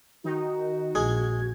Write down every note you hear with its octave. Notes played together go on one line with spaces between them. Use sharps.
D#3 D#4 F#4
A#1 G#3 G#6